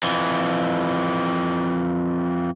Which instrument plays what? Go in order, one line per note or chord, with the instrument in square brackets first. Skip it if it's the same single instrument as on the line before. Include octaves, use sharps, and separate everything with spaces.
[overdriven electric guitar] F2 E3